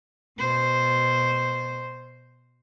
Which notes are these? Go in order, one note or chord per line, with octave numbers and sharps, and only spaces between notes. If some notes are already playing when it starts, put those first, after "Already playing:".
B2 C5